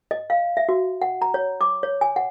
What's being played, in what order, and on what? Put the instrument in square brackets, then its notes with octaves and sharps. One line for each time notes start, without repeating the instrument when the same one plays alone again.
[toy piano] D#5
F5
E5
F#4
F#5
A#5
C#5
D6
C#5
G#5
F#5